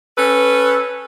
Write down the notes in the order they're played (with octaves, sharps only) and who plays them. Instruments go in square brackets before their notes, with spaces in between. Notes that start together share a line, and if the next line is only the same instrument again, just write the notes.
[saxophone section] C#4 A4 B4